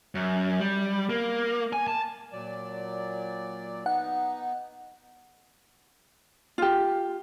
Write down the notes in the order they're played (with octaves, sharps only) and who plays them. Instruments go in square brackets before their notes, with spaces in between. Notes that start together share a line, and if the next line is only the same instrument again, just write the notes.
[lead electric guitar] F#2
G3
A#3
G#5
A5
[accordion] A#2 F#3 D5
[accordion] B3 D#4 [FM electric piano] F#5
[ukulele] F4 G4